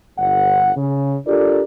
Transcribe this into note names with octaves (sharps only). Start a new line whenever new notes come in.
G1 F#5
C#3
D4 F4 G4 A4 A#4 D5